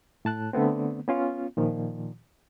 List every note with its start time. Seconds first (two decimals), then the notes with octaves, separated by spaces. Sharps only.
0.25 A2 A5 F#6
0.53 D3 A3 B3 C4
1.08 B3 C#4 F4
1.57 A#2 D#3 F3